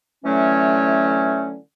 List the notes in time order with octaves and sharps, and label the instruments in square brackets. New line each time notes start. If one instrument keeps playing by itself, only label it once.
[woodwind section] D3 E3 F#3 A3 C#4